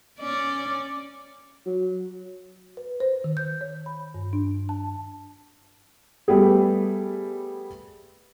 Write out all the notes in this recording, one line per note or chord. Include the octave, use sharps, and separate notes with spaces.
C#4 D5
F#3
B4
C5
D#3
G6
C#5
B5
G2
D4
A5
G3 A3 B3 G4 G#4